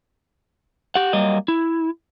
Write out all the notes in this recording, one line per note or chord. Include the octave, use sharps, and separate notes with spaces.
G4 F#5
F#3 G3 A#3 D#5
E4